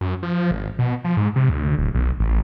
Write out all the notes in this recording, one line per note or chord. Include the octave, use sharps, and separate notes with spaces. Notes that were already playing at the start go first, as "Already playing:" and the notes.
F#2
F3
G#1
B2
F3
G#2
C3
D2
D1
B1
A1